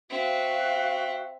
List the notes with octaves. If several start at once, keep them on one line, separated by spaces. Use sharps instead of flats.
C4 F#4 E5 F5